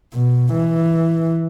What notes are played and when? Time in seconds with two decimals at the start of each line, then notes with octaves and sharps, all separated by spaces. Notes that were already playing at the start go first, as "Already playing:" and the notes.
0.14 B2
0.53 E3